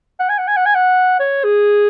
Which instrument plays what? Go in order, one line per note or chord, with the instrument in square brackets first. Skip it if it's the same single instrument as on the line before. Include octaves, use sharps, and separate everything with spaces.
[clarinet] F#5
G#5
F#5
G#5
F#5
G#5
F#5
C#5
G#4